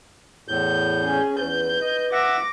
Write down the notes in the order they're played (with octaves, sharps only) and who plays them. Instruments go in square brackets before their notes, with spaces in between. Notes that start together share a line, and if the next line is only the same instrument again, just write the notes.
[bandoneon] E2 A2 G6
[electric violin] C#4 G#4
[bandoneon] E2 [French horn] B4 [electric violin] G6
[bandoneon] D#5
[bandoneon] E5 F#5 [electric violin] D6 A#6